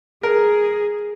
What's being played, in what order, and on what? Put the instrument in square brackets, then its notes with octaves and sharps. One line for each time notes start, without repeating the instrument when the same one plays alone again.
[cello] G#4 [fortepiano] A#4